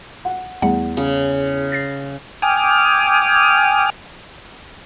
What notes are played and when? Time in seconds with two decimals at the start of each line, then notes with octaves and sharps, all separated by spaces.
0.25 F#5
0.62 E2 G3 A3 F#5
0.97 C#3
1.72 A6 A#6 C7
2.42 G5 G#5 D6 D#6 F6